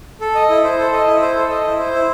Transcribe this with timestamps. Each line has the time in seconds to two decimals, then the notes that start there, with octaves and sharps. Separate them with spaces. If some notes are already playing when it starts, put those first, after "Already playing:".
0.21 A4
0.35 D#5
0.50 E4
0.64 C5
0.79 A4
0.93 D#5
1.07 E4
1.21 C5
1.36 A4
1.50 D#5
1.65 E4
1.79 C5
1.93 E4